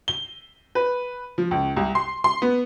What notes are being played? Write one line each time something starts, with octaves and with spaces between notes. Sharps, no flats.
G7
B4
F3
C#2
C2
C6
C6
B3